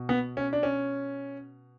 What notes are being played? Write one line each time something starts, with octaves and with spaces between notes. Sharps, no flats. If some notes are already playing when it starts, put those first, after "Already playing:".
Already playing: B2
B3
C#4
D4
C#4